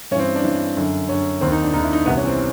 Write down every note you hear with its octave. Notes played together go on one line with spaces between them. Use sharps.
G2 E3 C4 C#4
D4
G2 E3
F#2 D3
F#2 D3 C#4
D#2 D#3 C4
D#4
D4
D#2 D#3 D#4
E4
D#4
C2 C3 E3 B3
C#4
C4